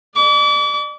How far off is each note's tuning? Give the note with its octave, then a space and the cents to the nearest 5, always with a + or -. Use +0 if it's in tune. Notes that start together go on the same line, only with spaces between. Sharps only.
D5 +40 D6 -40